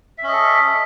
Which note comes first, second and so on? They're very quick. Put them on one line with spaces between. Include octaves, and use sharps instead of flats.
E5 C#4 D#5 A4